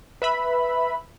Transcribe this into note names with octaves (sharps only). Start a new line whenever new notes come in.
B4 E5 B5